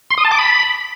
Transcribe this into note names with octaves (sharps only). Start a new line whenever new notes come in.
C6
D#6
A5
D6
B5